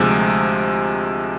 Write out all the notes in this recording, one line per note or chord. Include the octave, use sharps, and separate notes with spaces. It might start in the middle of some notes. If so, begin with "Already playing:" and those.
Already playing: D2 C3 F3 G#3